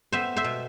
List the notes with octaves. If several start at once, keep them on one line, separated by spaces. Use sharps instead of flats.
B3 C5 E5
C5 E5
B2